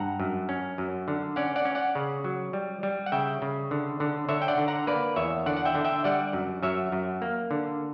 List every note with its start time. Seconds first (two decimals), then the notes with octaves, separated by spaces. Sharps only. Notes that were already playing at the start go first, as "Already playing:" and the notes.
Already playing: G2 F#5 A#5
0.20 F#2
0.49 C#4
0.78 F#2
1.08 D3
1.36 C#4 D5 F#5
1.56 D5 F#5
1.65 C#4
1.75 D5 F#5
1.95 C#3
2.24 F#3
2.53 G3
2.83 G3
3.06 F#5
3.12 C#3 E5 G5
3.42 C#3
3.71 D3
4.00 D3
4.29 D3 C#5 E5
4.42 G5
4.48 D5 F#5
4.58 D3
4.68 F#5 A#5
4.87 A#3 B4 D5
5.16 E2 C#5 E5
5.46 D3 D5 F#5
5.57 F#5
5.65 E5 G5
5.75 D3
5.85 E5 G5
6.04 G3 D5 F#5
6.33 F#2
6.63 F#2 C#5 E5
6.92 F#2
7.22 A#3
7.51 D3